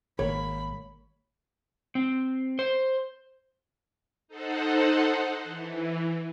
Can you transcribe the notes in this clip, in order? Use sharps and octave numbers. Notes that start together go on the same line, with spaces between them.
G#1 A#3 C#5 B5
C4
C5
D#4 A4 C5 F#5
E3